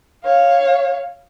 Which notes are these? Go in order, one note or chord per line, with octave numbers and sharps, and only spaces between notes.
C#5 F5